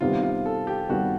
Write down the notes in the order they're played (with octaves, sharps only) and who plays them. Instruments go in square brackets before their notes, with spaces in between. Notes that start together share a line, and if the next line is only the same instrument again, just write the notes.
[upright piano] C3 D#3 G3 B3 [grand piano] F4
[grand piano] F4
A4
G4
[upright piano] C3 D#3 G3 B3 [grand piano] F#4